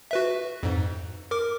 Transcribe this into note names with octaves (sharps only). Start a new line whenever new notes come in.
F#4 B4 E5
F2 G#2
A#4 D6